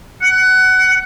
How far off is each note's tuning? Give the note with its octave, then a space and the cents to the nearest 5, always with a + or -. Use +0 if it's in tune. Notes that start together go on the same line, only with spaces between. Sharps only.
F#5 +20